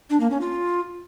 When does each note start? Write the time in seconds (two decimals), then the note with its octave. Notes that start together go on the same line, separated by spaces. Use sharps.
0.10 D4
0.20 A#3
0.31 C#4
0.41 F4